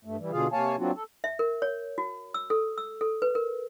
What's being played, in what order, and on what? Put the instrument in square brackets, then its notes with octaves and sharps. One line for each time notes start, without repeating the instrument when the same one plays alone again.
[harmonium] G2 A3
E3 G3
B2 D3 F4 G#4 F5
C3 A#3 C#5 F5 G#5 A5
F#3 A#3 C4 D4 F4 F#4
A4
[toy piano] E5
A#4
C#5
F#4
E6
A4
E6
A4
B4
A#4